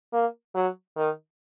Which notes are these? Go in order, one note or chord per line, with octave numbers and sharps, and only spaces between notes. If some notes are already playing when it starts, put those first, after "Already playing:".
A#3
F#3
D#3